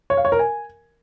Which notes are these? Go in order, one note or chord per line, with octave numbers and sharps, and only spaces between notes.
C#5
F5
C#5
A#4
G#5